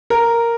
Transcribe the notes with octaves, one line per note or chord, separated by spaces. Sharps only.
A#4